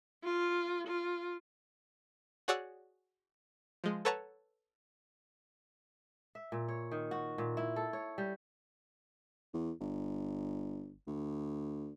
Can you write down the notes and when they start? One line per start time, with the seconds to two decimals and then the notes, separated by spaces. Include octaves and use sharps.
0.24 F4
0.87 F4
2.48 F#4 G#4 C#5 D5 F#5 E6
3.84 F3 G#3
4.05 A4 B4 C#5 F#5 A5 A#5
6.35 E5
6.52 A#2
6.68 C#5
6.91 D#3
7.11 F#4
7.38 A#2
7.57 E4
7.76 A4
7.93 C#5
8.18 G3
9.54 E2
9.81 G1
11.07 D2